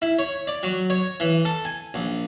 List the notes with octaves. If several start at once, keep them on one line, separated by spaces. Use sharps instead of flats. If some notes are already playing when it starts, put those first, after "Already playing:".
E4
C#5
D5
F#3
C#5
E3
A4
G#5
A#1